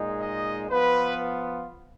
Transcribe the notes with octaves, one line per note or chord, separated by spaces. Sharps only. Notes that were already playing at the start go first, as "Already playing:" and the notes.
Already playing: A#2 G#3 D#4
D#5
F3 B3 F4 B4